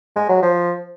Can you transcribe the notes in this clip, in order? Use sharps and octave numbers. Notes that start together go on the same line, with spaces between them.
G#3
F#3
F3